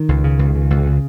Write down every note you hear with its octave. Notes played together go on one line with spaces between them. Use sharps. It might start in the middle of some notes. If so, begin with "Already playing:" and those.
Already playing: D#3
C#2
C#3
C#2
C#3
C#2
C#3